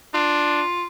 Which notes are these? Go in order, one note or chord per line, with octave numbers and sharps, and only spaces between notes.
D4 F4